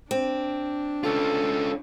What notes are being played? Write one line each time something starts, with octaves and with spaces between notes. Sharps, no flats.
C4 D4
C#4 F4 A4